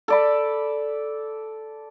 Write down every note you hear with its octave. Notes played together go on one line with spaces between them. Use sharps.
A4 D5 B5